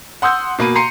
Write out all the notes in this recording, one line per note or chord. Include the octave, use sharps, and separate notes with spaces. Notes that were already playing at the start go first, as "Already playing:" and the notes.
F#5 C6 D#6 E6 G6
B2 A#3 B5 D#7
A#5 C6 C7 C#7 D#7